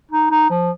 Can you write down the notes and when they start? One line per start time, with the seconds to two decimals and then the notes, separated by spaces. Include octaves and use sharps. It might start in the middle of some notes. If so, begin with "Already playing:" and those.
0.11 D#4
0.31 D#4
0.50 F3